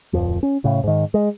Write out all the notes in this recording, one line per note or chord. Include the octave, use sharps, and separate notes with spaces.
D1 F2 F3
C#4
A2 C#3
G#2 D#3
G#3